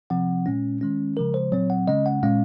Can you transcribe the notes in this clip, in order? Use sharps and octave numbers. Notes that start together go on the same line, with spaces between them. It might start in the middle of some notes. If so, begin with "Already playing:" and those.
C3 F3 C4 F#5
A#2 G#3 C#4
D#3 G#3 C#4
C#3 F3 G#3 A#4
C5
A#2 F#3 C4 C#5
F#5
C#3 G#3 C#4 D#5
F#5
A#2 G#3 C#4 F5